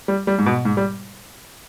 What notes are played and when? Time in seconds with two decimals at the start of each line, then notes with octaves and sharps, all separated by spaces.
0.08 G3
0.27 G3
0.38 G#2
0.46 B2
0.65 G#2
0.77 G3